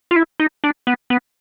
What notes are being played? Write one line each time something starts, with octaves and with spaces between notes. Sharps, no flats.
F4
E4
D#4
D4
B3
B3